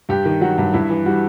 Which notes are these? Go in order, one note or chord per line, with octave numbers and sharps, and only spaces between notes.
G2 G4
D#3
F#3 F#4
G2
G2 E4
E3
G3 F#4